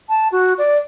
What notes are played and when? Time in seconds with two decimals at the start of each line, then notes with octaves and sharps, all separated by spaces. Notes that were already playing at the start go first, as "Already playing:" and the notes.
0.09 A5
0.32 F#4
0.58 D5